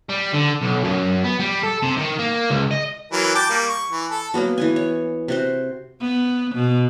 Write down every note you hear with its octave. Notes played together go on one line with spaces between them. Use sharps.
G3
D3
B1
F#2
B3
G3
A4
C3
D#3
A#3
C#2
D#5
E3 F#3 A#4
G5 A5 D6
G3 A#3
C#6
E3
A4
F#3 A#3 B3 F#4
E3 B3 G#5
C#5
C3 F#4 C5
B3
B2